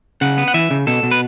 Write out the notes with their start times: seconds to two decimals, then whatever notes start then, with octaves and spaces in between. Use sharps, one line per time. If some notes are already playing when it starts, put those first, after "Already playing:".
0.21 C#3 F#5
0.38 B3
0.48 F#5
0.54 E3 E5
0.71 C#3
0.87 B2 A4
1.03 B2
1.11 B4